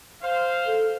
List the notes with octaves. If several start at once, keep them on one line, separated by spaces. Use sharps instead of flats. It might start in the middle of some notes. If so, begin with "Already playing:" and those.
C5 F5
A4